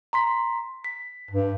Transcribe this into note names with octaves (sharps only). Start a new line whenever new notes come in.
A#5 C6 B6
B6
G2